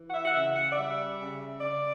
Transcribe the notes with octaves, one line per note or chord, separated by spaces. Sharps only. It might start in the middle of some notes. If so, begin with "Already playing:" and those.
Already playing: E3
F#5
E5
F#5
C#3 E5
F#5
D5
G3 E5
C#3
C#3 D5